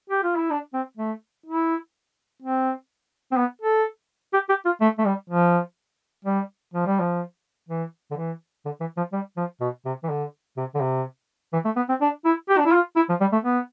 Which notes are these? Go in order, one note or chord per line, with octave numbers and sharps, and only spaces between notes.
G4
F4
E4
D4
C4
A3
E4
C4
C4
B3
A4
G4
G4
F4
A3
A3
G3
F3
G3
F3
G3
F3
E3
D3
E3
D3
E3
F3
G3
F3
B2
C3
E3
D3
C3
D3
C3
E3
A3
B3
C4
D4
E4
G4
D4
E4
F4
E4
F3
G3
A3
B3